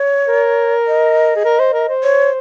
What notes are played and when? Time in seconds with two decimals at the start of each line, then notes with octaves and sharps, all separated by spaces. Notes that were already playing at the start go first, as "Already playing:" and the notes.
Already playing: C#5
0.28 A#4
0.87 D#5
1.36 G#4
1.45 A#4
1.60 C5
1.74 A#4
1.89 C5
2.03 C#5